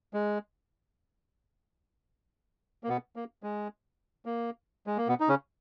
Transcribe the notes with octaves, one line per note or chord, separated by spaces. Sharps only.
G#3
A#3
B2 B3
A#3
G#3
A#3
G#3
A#3
B2 B3
D#4
C#3 C#4